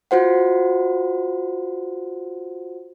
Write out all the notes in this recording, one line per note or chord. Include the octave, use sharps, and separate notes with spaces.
F4 F#4 C5 F#5